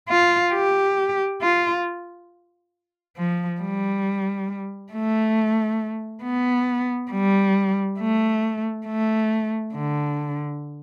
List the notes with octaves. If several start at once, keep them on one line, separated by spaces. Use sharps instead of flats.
F4
G4
F4
F3
G3
A3
B3
G3
A3
A3
D3